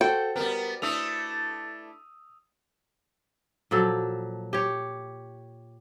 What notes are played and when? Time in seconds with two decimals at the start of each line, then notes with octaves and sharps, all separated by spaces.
0.01 F#4 A4 C5 G5
0.36 G3 B3 A#4
0.82 A3 D4 E4 D#6 E6 F7
3.71 A#2 F3 F#3 A4
4.53 G4 C#5